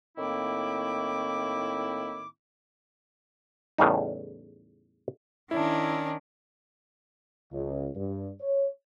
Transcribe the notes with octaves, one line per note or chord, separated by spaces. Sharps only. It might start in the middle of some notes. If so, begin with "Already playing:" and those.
A2 D#3 A#3 C4 E4 D6
E2 A2 C#3 G3 D#4
D#3 C#4 D4 E4
C#2
G2
C#5